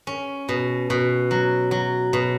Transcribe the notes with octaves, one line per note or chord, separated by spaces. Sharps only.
C#4
B2
B2
F#3
F#3
B2